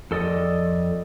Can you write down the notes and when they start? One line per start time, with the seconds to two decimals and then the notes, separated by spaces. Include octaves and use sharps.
0.11 F2 A4 D5 D#5